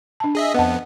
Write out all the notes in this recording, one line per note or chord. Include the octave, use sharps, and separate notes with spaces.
D4 A5
G#4 D#5 E5
F2 B3 D#5 F#5 A5